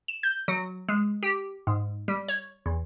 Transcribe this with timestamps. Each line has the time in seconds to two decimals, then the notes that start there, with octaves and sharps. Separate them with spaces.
0.08 E7
0.23 G6
0.48 F#3
0.89 G#3
1.23 G4
1.67 G#2
2.08 G3
2.28 C#5
2.66 E2